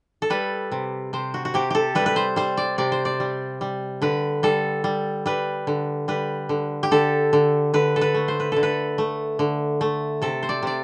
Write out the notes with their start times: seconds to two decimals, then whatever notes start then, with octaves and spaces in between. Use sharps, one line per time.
0.22 A4
0.30 G3 B4
0.72 C3
1.13 C3 C5
1.34 F#4
1.45 F#4
1.54 C3 G4
1.70 G4 A4
1.95 G3 B4
2.06 B4
2.16 C5
2.36 G3 C5
2.57 D5
2.78 C3 D5
2.92 C5
3.05 D5
3.20 G3
3.61 G3
4.02 D3 B4
4.43 G3 A4
4.84 G3
5.26 G3 B4
5.67 D3
6.08 G3 B4
6.49 D3
6.83 G4
6.91 D3 A4
7.33 D3
7.74 D3 B4
7.96 A4
8.01 B4
8.14 A3
8.28 C5
8.40 B4
8.52 D3 A4
8.63 B4
8.98 A3
9.39 D3
9.81 A3
10.22 C3 A4
10.43 C5
10.49 D5
10.63 C3 D5